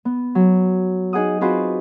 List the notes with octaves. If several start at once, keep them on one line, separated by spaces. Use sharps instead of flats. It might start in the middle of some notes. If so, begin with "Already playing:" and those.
B3
F#3
D#4 G#4 F#5 D#6
C4 F4 F#4 G#4 B4 C5